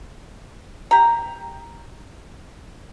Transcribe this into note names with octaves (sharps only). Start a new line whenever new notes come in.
G4 A#5